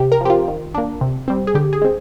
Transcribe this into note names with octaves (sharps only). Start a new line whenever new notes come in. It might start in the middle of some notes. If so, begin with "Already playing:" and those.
Already playing: C3 G4
A#4
F3 C4 G4
F4
D#3
A#3 D4
C3
G3 C4
G#4
D3 G4
G#4
G#3 C4